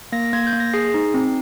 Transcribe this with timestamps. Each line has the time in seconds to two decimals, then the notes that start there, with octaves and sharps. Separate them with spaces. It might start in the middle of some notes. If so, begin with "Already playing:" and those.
0.12 A#3 A#6
0.33 A#3 G#6
0.47 G6
0.53 A#3
0.60 A#6
0.74 G#4 C7
0.94 D#4
1.14 C4